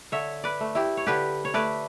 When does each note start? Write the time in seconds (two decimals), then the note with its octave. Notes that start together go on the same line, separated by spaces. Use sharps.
0.12 D3 C#5 E5
0.44 B4 D5
0.61 A3
0.75 E4 G4
0.97 C#5
1.07 D3 G4 B4
1.45 C#5
1.54 A3 B4 D5